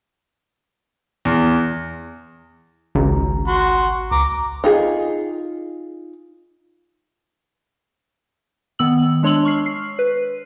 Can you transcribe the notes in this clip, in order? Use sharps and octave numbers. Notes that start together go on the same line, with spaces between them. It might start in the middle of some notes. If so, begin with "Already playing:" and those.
E2
G#1 C#2 A#5
F#4 C6
C#2 A#5 D6
D#4 F4 G#4
D#3 B3 E6 F#7
G#3 D4 C#5 C6 E6 F#7
C#6 F6 C7
C7
B4